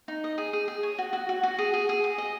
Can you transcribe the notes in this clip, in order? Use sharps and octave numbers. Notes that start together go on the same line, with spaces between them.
D#4
D#5
G#4
G#4
G#4
C#5
F#4
F#4
F#4
F#4
G#4
G#4
G#4
G#4
D#5